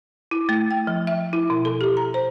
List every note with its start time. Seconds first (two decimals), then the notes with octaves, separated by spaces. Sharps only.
0.31 E4
0.49 A3
0.71 G5
0.87 F3
1.07 E5
1.33 E4
1.50 B2
1.65 A4
1.81 G4
1.97 A#5
2.14 C5